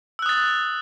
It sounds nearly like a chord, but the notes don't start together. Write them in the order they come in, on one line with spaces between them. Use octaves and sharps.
E6 F#6 D#6 A6